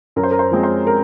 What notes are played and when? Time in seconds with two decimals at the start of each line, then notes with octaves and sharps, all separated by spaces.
0.16 F#2 A#4
0.23 C5
0.31 A#4
0.39 C5
0.51 F3 G#3 C4
0.63 C5
0.87 A#4